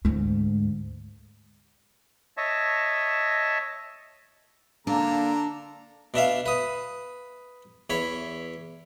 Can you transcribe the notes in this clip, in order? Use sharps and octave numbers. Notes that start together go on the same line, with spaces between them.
D2 G#2
C#5 D#5 E5 A5
D3 A#3 D4 A4 A#5
B2 D4 E5 F5
B4 D#6
E2 C#5 B5